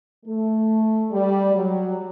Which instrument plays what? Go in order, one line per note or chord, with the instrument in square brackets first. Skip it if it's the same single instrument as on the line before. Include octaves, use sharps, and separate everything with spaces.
[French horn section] A3
G3
F#3